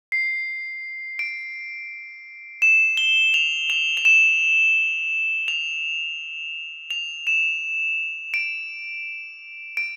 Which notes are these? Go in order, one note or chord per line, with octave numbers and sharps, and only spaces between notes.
C7
D7
E7
G7
F7
F7
F7
E7
F7
F7
E7
D7
D7